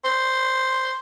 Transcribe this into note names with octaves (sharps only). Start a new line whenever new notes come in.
C5